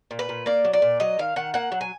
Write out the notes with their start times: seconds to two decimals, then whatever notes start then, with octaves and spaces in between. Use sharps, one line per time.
0.11 A#2
0.19 B4
0.29 A#2
0.46 A#3 D5
0.65 F#3
0.73 D5
0.82 A#2
1.00 F#3 D#5
1.19 D#3 F5
1.36 D#3 F#5
1.54 A#3 F#5
1.72 F#3
1.81 G#5